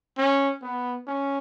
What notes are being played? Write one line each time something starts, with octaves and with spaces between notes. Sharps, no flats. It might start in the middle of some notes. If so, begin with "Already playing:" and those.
C#4
B3
C#4